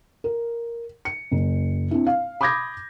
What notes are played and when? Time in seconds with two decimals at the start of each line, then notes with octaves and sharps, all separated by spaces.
0.24 A#4
1.05 C#7
1.31 F#1
1.91 C4 D4 E4
2.07 F5
2.41 B5 D6 D#6 G6 G#6 A#6